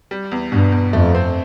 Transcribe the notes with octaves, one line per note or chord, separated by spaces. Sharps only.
G3
E2
G2 B2
E2
F2 A3
C4